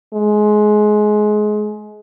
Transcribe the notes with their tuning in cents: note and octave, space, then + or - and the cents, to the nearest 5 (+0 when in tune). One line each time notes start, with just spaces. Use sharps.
G#3 +20